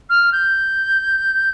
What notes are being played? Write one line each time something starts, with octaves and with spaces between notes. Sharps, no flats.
F6
G6